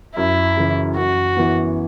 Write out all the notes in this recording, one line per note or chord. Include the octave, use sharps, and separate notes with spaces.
F#2 E4
C#3 E3
F#2 F#4
E3 B3